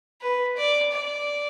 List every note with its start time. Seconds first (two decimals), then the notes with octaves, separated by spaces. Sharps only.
0.21 B4
0.57 D5
0.93 D5